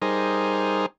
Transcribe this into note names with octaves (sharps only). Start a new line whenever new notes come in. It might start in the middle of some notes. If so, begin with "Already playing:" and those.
G3 D#4 G#4 A#4 C5